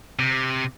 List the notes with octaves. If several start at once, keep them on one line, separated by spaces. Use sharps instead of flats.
C3